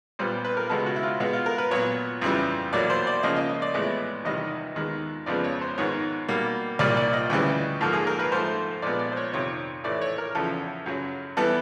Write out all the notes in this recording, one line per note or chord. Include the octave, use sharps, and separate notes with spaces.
A#2 G3 B3 C5
B4
A#4
C#2 B2 G#3 B3 A4
F#4
E4
F4
B2 G#3 B3
F4
A#4
B4
A#2 F#3 B3 C#5
F2 C#3 E3 G3
E2 B2 F#3 A#3 D5
C5
D5
C#2 C#3 F3 A#3 D#5
D#5
D#5
D5
A2 E3 G#3 B3
E2 C3 D#3 G3 D#5
D#2 D#3 G#3 B3
F2 C#3 F3 G#3 B3 D5
C#5
C5
G#2 D#3 G#3 B3 C#5
B2 G3 A#3
C2 A#2 G3 A#3 D5
D5
D#5
D2 C#3 E3 G3
G#2 F3 A#3 A4
G#4
A#4
B4
G#2 F3 A3 C5
A#2 F3 G#3 B3 D5
D5
C5
C#5
F2 C3 D#3 C#5
A2 E3 A3 D5
C#5
A#4
E2 C#3 F3 A4
F#2 C#3 F#3
E3 G3 B3 A4